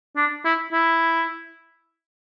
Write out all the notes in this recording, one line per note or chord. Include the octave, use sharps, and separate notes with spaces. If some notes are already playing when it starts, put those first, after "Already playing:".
D4
E4
E4